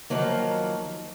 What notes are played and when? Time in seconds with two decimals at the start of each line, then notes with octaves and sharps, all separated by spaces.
0.10 D#3 F3 F#3 A#3